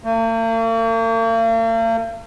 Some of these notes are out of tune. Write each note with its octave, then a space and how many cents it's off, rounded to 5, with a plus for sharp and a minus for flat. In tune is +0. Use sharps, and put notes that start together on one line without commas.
A#3 -45